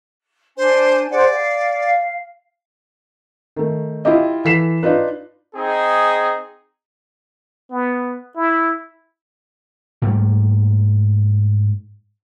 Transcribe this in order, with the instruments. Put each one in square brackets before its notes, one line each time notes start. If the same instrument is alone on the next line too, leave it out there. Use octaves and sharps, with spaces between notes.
[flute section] D4 G#5 [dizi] C5
[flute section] G#4 C5 F#5 [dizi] D5
[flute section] F5
[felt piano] D#3 A3
E4 F4 G4 D#5
E3 A4 B6 C7 E7
D4 D#4 F4 B4
[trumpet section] C4 D#4 G#4
[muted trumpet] B3
E4
[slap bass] G#2 G3 A3 A#3